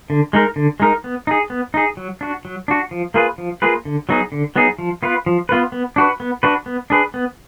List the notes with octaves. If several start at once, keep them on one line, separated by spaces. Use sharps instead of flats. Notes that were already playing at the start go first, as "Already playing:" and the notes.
D3
G#3 D#4 A#4
D3
G#3 D#4 A#4
B3
D#4 G#4
B3
D#4 G#4
F#3
D4 F#4
F#3
D4 F#4
F3
A#3 F4 G#4 B4
F3
A#3 F4 G#4 B4
D3
F#3 B3 D#4 G#4
D3
F#3 B3 D#4 G#4
F3
B3 F4 B4
F3
B3 F4 B4
B3
D4 F#4 B4
B3
D4 F#4 B4
B3
D4 G#4 B4
B3